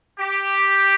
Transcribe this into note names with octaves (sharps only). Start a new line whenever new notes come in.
G4